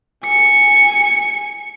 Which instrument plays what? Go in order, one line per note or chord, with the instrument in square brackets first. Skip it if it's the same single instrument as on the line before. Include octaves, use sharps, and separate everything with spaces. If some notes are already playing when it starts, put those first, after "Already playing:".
[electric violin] G#5 C#7